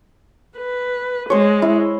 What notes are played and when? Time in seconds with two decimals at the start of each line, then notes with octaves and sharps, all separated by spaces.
0.58 B4
1.30 G#3 C5 C#5
1.62 E4